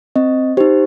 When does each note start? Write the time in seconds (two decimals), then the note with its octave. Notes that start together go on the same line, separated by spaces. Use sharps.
0.16 C4 D#5
0.57 D#4 G4 C5